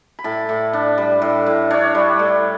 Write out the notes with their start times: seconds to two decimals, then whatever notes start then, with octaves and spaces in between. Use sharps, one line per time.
0.19 B5
0.24 A2 A5
0.49 A2
0.73 D4
0.98 G3
1.22 A2
1.46 A2
1.70 D4 C#5
1.95 G3
2.19 A2